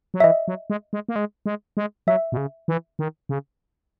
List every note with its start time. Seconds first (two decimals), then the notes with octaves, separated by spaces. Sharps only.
0.14 F#3
0.20 E5
0.24 E3 D#5
0.48 F#3
0.70 G#3
0.93 G#3
1.09 A#3
1.16 G#3
1.46 G#3
1.77 G#3
2.07 F#3 E5
2.32 B2
2.37 C#3
2.68 E3
2.99 D#3
3.29 C#3